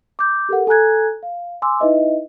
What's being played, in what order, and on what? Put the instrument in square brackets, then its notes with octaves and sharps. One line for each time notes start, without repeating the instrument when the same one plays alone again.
[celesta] D6 G6
G4 A4 A#4 F#5
A4 G#5 A#5 F#6 G#6
F5
G#5 C6 D6 E6
D#4 E4 B4 D#5 E5